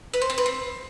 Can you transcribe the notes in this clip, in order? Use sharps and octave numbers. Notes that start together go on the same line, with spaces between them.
B4
C5
C4
B4
C4